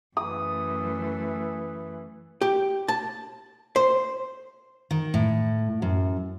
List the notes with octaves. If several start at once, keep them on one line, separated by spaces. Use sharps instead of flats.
F#2 E3 A3 D#6
G4
A5
C5
D#3
A2
F#2